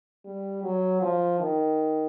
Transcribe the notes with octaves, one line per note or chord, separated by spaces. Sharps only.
G3
F#3
F3
D#3